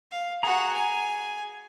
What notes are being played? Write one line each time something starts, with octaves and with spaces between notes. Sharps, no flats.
F5
F#4 G#4 F#5 A#5
G#5